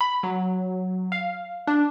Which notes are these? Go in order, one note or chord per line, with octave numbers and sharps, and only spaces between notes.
B5
F#3
F5
D4